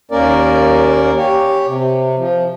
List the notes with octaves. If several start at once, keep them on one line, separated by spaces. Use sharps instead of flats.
D#2 A#3 C#4 A#4 D5
G4 C#5
C3
F3